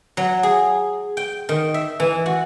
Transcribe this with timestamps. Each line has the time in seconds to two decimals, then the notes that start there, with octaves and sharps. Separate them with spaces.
0.17 F#3
0.43 G#4
1.17 G5
1.49 D#3
1.74 E5
2.00 E3
2.26 F#4